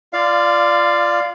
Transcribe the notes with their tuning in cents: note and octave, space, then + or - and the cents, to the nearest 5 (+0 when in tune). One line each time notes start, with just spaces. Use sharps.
F4 -20 D5 +5 F5 +0